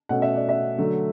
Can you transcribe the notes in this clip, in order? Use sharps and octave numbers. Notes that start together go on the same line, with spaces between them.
B2 A3 C#4 F#5
E5
D5
E5
D3 F#3 A3